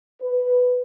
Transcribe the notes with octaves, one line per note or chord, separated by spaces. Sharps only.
B4